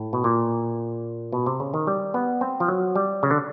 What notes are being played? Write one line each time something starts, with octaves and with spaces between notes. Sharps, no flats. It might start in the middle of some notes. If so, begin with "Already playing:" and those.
Already playing: A2
B2
A#2
B2
C3
C#3
D#3
G3
B3
C4
F3
F#3
G3
C#3
D3